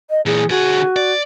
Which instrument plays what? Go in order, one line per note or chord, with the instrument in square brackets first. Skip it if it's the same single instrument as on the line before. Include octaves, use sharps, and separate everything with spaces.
[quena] D#5
[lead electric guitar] A#2 E3 [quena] G#4
[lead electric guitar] D3 G#4 [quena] F#4
[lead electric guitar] D5